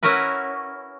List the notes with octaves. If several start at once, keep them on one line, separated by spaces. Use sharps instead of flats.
C#4 E4 F#4 A#4 B4